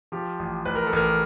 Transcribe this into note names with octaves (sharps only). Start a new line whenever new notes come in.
F3 G4
A1
A1 B4
A#4
A4
A1 A#4